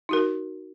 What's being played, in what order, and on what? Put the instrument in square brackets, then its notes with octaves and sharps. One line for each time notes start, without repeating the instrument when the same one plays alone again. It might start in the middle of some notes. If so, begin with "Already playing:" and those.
[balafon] D#4 F#4 A#4